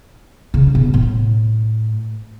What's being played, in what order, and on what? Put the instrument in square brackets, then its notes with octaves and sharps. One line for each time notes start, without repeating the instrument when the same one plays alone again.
[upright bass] C#3
B2
A2